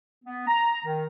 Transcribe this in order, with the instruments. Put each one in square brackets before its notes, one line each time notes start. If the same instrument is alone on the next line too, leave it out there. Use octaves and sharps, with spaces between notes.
[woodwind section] B3
A#5
D#3